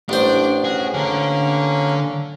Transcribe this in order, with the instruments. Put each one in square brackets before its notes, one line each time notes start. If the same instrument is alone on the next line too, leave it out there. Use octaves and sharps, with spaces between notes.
[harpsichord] A1 C5 [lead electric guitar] D4
[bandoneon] C#4 F#4 [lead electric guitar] G#4
[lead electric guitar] D3 A4 [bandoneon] A#3 C#4 F6